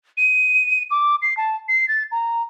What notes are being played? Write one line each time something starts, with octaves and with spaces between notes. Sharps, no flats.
D#7
D6
C7
A5
C7
A6
A#5